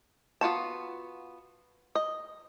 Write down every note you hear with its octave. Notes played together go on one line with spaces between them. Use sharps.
B3 F4 F#4 A5
D#5